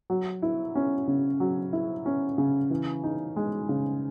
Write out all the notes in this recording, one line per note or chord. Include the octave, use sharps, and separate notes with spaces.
F#3
E4
C#4
C#3
F#3
E4
C#4
C#3
E3
D#4
G#3
C#3